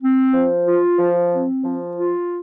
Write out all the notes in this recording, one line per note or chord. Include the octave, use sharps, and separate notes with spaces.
C4
F3
F4
F3
C4
F3
F4